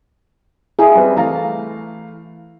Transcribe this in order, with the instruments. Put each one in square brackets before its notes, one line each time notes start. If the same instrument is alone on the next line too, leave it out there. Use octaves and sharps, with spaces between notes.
[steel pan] E4 G#4
[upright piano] G3 C4 B4
[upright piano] E3 A3 F5 [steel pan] A5 A#5